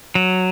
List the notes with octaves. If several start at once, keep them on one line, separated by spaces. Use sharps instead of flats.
F#3